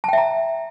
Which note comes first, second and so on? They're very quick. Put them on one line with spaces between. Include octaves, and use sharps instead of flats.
A5 G5 E5 A#5